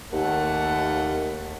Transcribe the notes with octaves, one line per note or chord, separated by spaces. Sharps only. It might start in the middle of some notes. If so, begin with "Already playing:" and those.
D#2 A3 F#5